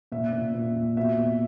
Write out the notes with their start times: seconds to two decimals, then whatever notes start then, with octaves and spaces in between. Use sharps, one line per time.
0.12 A#2 E5
0.33 A#2
0.54 A#2
0.76 A#2
0.97 B2 E5
1.18 B2